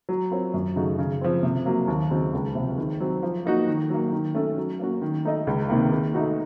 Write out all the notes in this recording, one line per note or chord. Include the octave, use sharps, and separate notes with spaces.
F#3
C4 F4 A#4 C#5
F#2
C#3 A3 D#4 F#4
C#3
F3 C4
C3
F#3 A#3
D#2
C#3 F#3 C4 D#4
C#2
C3 F3
D#3
F#3 C4
F3
A#3 D#4 F#4
D#3
F#3 A#3
D#3
A3 C#4 A4
F#3
A#3 C#4 F#4
D#3
A3 D#4 A4 D#5
C#2
C3 D#3 A#3
D#3
A3 D#4 F#4